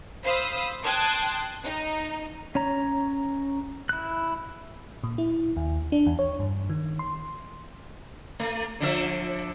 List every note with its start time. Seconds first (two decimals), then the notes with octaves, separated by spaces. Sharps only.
0.24 C5 F5 B5 D#6 E6
0.83 G5 A5 C6 D#6 F#6 G#6
1.62 D#4
2.55 C#4 C#5 A#5
3.89 E4 F#6
5.04 A#2
5.18 E4
5.57 D#2
5.92 D4
6.07 E2
6.19 C#5
6.39 G2
6.70 D#3
6.99 C6
8.40 A3
8.80 D3 F3 E5